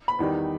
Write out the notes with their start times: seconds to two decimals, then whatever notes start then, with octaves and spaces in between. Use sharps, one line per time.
0.08 B5
0.19 E2 D#3 G3 D#4